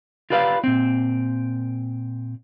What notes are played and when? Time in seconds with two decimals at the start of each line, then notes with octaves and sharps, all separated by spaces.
0.30 F4 G4 B4 D5 F5
0.64 A#2 C4